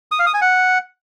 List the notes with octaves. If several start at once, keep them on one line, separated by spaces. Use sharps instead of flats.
D#6
F5
D#6
G#5
F#5